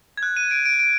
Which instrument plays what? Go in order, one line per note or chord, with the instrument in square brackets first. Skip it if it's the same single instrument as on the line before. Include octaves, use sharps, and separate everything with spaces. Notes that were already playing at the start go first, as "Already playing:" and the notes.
[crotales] G#6
F#6
D#7
D7
D7
D7